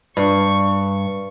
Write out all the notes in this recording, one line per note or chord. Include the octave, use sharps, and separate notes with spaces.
G2 C#6